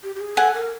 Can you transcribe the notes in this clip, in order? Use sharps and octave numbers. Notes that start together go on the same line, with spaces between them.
G4
G4
G#4
A4 F#5 G#5
A#4